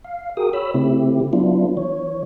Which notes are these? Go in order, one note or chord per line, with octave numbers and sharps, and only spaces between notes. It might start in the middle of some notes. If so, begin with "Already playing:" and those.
F5
F#4 G#4 A#4 G5 D#6
C#5 B5 E6
C#3 A3 C4 E4 G4
F#3 B3 D4 E4 F4
E3 C#5